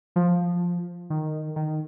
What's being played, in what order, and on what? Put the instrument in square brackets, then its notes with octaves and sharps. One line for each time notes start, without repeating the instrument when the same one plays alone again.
[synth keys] F3
D#3
D#3